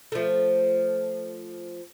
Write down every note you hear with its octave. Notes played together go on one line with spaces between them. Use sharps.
F3 A3